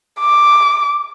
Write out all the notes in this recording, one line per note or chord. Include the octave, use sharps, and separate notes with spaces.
D6